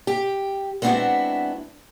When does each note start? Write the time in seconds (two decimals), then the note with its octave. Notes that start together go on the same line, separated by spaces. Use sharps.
0.07 G4
0.82 G#3 B3 C4 D4 E4 F#4